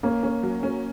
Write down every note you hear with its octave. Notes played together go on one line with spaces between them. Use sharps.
A#3 C#4
C#4
F#3
C#4